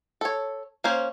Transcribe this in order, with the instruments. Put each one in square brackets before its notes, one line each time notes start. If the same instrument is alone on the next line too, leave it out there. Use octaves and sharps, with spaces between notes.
[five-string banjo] A4 C#5
A#3 C#4 C5